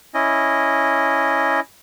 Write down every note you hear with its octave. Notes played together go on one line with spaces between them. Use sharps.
C#4 E4 D#5